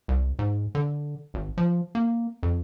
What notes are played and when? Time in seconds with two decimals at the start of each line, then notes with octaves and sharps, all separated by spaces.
0.08 C2
0.39 G#2
0.75 D3
1.34 G#1
1.58 F3
1.95 A#3
2.43 F2